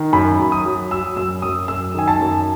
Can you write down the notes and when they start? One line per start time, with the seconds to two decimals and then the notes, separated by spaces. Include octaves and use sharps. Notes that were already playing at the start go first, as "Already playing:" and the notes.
Already playing: D#3
0.13 F#2 B5
0.39 F#2
0.52 D#6
0.65 F#3
0.91 F#3 E6
1.16 F#2 E6
1.42 F#2 D#6
1.68 F#2 E6
1.94 D#3 G#5
2.08 A5
2.20 F#2